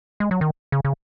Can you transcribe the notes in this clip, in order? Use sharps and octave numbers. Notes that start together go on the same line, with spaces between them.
G#3
F#3
D#3
C#3
C#3